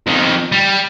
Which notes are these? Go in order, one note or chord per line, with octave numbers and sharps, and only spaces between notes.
F2 D#3
G3